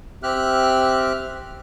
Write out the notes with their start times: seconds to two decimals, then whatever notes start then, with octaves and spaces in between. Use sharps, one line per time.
0.23 C4 G4 E5 F6 F#6